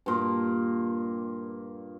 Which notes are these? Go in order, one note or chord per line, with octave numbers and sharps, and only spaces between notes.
G2 A#2